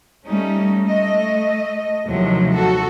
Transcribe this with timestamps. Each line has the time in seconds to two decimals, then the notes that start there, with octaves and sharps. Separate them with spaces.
0.26 G3 A3 C#4 D#4
0.83 A3 D#5
2.07 D#2 A2 C3 F3 F#3
2.53 F#4 A4